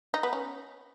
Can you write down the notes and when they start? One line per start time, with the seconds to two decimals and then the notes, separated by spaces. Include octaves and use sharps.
0.14 D#4
0.23 B3
0.33 C#4